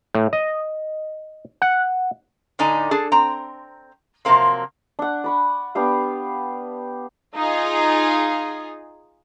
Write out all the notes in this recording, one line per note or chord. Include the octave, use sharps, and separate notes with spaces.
A2
D#5
F#5
A2 D3 D#4 D5 G#5
D4 G#4 A4
C4 A#5
C3 F3 F#3 A#3 C4
D4 F#5
D5 B5 C#6
B3 D4 G4 F5
D#4 F4 G#4